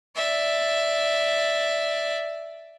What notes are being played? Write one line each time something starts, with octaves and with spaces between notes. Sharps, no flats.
D5 E5